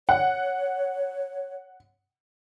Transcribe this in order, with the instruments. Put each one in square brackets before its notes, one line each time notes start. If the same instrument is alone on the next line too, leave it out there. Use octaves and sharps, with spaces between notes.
[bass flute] C#5 [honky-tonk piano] F#5